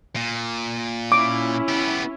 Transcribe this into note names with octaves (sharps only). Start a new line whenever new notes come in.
A#2
C#4 E4 D6
B3 G4